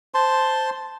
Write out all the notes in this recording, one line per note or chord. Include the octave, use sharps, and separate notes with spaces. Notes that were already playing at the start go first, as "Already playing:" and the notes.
C5 A5 C6